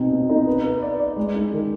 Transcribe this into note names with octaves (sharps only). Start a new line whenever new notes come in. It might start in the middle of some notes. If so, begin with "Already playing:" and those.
Already playing: B2 C4 D#4
B2
D#4
B4
B4
D5
D5
G#3
D#4
D#3